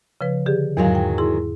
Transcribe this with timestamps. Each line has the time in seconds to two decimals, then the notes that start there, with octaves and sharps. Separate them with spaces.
0.21 C#3 F3 B4
0.46 D3 G4 G#4
0.77 E2 G#2 D#3 F#3 G#3 F5
0.95 G5
1.18 E4 G#4 C6